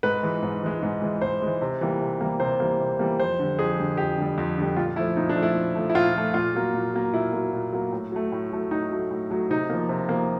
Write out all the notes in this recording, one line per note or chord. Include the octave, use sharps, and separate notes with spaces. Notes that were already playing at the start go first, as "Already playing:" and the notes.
G#2 B4
E3 G#3
G#2
E3 G#3
G#2
E3 G#3
G#2 C5
E3 G#3
C3
E3 G3 A#3
C3
E3 G3 A#3
C3 C5
E3 G3 A#3
C3
E3 G3 A#3
F2 C5
D3 G3
F2 G#4
D3 G3
F2 G4
D3 G3
F2
D3 G3
A#2 F4
F3 A3 E4
A#2 D#4
D4
F3 A3
E4
A#2
F3 A3
E4
A#2 F4
F3 A3
A#2 F4
F#3 A#3
A#2
F#3 A#3
A#2 E4
F#3 A#3
A#2
F#3 A#3
A2
F#3 A3
A2
F#3 A3
A2 D#4
F#3 A3
A2
F#3 A3
C3 D#4
F3 A#3
C3
F3 A#3